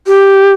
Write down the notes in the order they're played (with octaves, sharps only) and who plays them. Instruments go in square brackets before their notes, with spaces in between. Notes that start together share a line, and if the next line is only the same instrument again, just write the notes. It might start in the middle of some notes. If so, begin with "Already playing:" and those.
[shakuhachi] G4